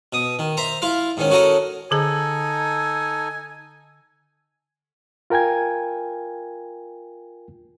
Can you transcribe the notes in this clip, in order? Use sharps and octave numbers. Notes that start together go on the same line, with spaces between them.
B2 D#6
D#3
C5 E5 A#5
E4 F4 F5
G#2 D#3 C#4
C#4 F#4 A4 A#4 D#5
D3 D#4 G#4 A4 G#5 G#6
F4 A#4 G5 G#5 G#6